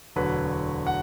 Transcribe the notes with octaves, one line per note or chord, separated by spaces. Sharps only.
E1 D2 D3 F#3 B4
F#5